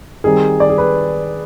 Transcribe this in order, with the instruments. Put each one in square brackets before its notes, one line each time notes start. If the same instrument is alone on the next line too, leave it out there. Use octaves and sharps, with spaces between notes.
[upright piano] D#3 G3 C4 D#4 G#4
D5
G#4
B4